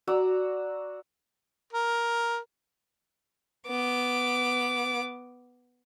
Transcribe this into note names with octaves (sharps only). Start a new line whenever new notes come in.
F#4 D5 A#5 E6
A#4
B3 D6